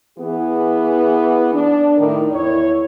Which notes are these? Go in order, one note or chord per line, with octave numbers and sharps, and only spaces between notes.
E3 B3 G#4
D4
A2 D#3 A#4 D5
E2 E4 C#5